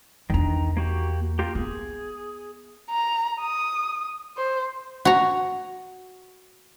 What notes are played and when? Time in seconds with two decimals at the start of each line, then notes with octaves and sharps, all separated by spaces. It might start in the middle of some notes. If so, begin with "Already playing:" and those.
0.30 E2 D#3 D4 A#5
0.77 A#3 F#4 G4
1.39 A#3 F4 G4
1.55 B3 G#4
2.91 A#5
3.42 D#6
4.37 C5
5.05 F#4 A#5